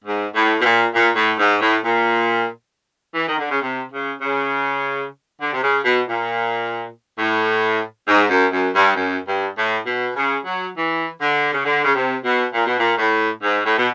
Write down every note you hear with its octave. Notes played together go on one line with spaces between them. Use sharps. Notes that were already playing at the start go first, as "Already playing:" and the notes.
G#2
A2
B2
A#2
A#2
A2
G#2
A2
A#2
E3
D#3
D3
C#3
C3
C#3
C#3
D3
C3
C#3
B2
A#2
A2
G#2
F#2
F#2
G2
F#2
G2
A2
B2
C#3
F#3
E3
D3
C#3
D3
C#3
C3
B2
A#2
B2
A#2
A2
G#2
A2
B2